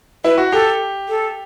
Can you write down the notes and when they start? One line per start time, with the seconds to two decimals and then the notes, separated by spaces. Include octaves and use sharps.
0.24 E4 B4
0.38 F#4
0.52 G4 A4
1.09 A4